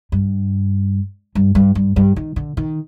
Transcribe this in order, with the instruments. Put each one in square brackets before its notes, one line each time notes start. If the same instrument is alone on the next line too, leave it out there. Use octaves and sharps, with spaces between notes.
[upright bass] G2
G2
G2
G2
G2
D#3
D3
D#3